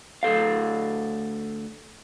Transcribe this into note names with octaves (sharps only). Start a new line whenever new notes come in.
D2 A4 F5